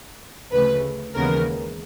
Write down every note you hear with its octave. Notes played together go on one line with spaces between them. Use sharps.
D2 C#3 F3 A3 B4
D#2 C#3 E3 G#3 B3 A#4